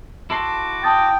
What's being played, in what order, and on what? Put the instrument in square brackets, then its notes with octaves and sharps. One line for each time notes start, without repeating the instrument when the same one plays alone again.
[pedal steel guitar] E4 A4 C6 [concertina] F#4 D6
[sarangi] G5 [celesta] A5 D#6 A6